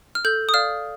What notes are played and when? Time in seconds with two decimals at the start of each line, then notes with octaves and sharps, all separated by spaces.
0.15 F6
0.25 A4 G6
0.49 D#6
0.54 D5 F5 F6